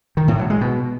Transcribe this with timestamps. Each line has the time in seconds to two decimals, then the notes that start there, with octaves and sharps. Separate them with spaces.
0.17 D#3
0.28 A2
0.39 F#3
0.50 G#3
0.61 B2